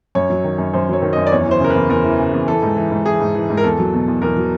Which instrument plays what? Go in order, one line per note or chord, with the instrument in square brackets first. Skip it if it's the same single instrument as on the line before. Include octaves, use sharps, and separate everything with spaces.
[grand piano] F#2 C#5
F#3
D#3
F#2
F#2 C5
F#3 C#5
D#3
F#2 D#5
D5
E2 C#5
E3
C5
C#3 A#4
B4
E2
E2 A#4
E3
C#3
E2
E3 A4
G#2
E3
G#2
E3 G#4
G#2
E3
G#2
A#4
E2 A4
F#3
B2
E2
E2 A#4
F#3